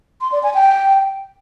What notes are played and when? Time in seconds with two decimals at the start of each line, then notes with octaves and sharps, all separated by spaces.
0.21 C6
0.32 D5
0.43 G#5
0.54 G5